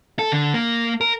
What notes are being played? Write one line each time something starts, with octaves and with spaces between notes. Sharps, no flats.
A4
D3
A#3
A#4